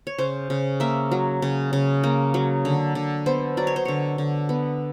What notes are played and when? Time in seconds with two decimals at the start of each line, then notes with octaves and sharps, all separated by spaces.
0.07 C#5
0.18 C#3 C5
0.50 C#3
0.80 A#3 E5
1.11 F#3
1.42 C#3
1.73 C#3
2.04 A#3
2.34 F#3
2.65 D3
2.95 D3
3.26 B3 C5
3.57 F#3 D5
3.67 C#5
3.76 C5
3.85 D3 C#5
4.18 D3
4.49 B3